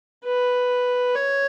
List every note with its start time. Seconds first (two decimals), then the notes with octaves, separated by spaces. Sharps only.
0.25 B4
1.15 C#5